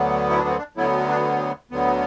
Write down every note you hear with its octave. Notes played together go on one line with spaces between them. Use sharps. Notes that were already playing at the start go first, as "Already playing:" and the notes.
Already playing: D2 D3 F#3 B3
E4
D4
C4
D4
D2 D3 F#3 B3 E4
D4
D2 D3 F#3 B3